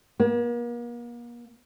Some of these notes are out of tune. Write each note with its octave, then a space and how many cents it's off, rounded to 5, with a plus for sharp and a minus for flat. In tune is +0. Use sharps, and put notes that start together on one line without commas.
A#3 +40